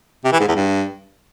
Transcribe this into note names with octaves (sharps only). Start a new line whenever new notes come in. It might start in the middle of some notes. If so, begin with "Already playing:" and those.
C3
E3
G#2
E2
G2